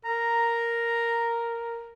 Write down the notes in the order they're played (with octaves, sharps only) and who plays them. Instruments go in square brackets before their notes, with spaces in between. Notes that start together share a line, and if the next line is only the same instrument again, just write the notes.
[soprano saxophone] A#4 [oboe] A#5